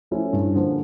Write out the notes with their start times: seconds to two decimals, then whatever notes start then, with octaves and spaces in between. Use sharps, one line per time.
0.11 F3 A3 C#4 E4
0.33 G2
0.55 D3 F3 A#3